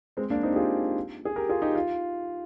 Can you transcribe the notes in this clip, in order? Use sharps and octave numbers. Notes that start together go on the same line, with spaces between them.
G#3 C4
A#3 D4
C4 D#4
G4
F4 G#4
G#4
G4 A#4
F4 G#4
D#4 G4
F4